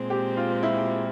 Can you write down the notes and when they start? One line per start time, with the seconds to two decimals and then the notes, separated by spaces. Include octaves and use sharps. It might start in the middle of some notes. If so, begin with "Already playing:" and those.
Already playing: A#2 G#3 C4
0.10 G4
0.37 F4
0.63 E4